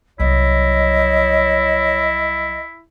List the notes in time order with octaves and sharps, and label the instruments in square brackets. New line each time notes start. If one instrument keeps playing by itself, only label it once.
[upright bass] C2 F#3 [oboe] E4 [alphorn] C#5 [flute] D#5